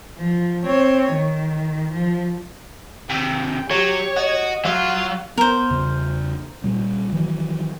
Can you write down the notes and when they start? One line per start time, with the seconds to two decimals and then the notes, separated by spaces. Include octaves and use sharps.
0.18 F3
0.65 C4 C#5
1.13 D#3
1.93 F3
3.09 D#2 C3 G5
3.71 F#3 G4 C#5
4.16 F#4 D#5
4.65 F#3 F4 F5
5.38 B3 A#4 C5
5.70 E2 C#3
6.64 A#2 G3
7.12 D#3 E3 F#3